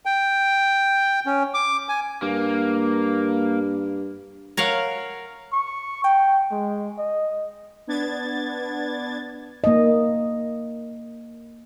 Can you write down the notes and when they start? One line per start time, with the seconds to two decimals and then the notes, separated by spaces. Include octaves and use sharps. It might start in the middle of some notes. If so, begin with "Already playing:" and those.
0.05 G5
1.26 C#4
1.54 D6
1.89 G#5
2.22 G2 A#3
4.57 A#4 C#5 F5 F#5
5.52 C#6
6.04 G5
6.51 G#3
6.98 D#5
7.87 B3 D4 G#6 A6
9.64 A#3 D#5